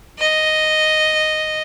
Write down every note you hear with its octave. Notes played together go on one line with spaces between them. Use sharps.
D#5